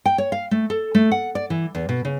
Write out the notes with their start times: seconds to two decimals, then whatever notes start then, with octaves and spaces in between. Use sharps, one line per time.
0.06 G5
0.18 C#5
0.32 F5
0.51 A3
0.70 A4
0.95 A3
1.11 F#5
1.35 D5
1.50 E3
1.75 E2
1.89 B2
2.05 C#3